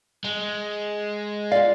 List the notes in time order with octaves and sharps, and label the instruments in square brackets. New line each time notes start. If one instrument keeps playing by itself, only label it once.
[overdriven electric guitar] G#3
[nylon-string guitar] F4 D5 [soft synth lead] F5